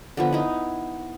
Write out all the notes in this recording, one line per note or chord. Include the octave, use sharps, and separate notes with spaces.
D3 F3 B3
D#4 E4